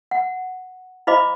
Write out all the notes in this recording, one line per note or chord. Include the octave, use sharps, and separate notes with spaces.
F#5
E4 C5 D#5 F5 B5 D6